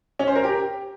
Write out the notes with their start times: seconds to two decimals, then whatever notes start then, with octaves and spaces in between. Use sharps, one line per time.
0.19 C#4
0.28 C5
0.36 A#4
0.44 G4